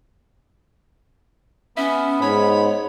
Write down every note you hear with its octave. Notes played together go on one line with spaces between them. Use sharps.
B3 C#4 E5
G#2 C#5 B5